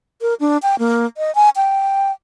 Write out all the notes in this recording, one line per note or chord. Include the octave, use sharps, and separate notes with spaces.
A#4
D4
G5
A#3
D#5
G#5
G5